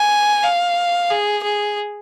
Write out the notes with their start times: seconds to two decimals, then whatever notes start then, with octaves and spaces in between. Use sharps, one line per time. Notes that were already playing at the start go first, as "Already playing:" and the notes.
Already playing: G#5
0.43 F5
1.10 G#4
1.43 G#4